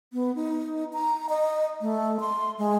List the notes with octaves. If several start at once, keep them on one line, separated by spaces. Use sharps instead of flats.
B3
D#4
A#5
D#5
A3
C6
G#3